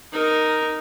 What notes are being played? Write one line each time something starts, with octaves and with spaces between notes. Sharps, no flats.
D#4 A#4